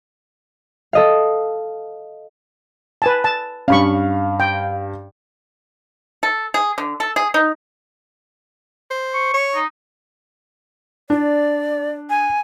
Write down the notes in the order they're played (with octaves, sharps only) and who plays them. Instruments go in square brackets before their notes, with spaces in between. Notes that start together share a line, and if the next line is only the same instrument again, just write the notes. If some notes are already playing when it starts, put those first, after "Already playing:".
[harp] A4 D#5 F5
[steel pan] B4 G#5 A5
A5
[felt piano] G2 F5 [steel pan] C#4 B5 C#6
[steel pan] G5
[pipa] A4
G#4
D3
A4
G#4
D#4
[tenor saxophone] C5
[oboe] C#6
[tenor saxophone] C#5
[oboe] D#4
[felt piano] D4 [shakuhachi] D5
[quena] G#5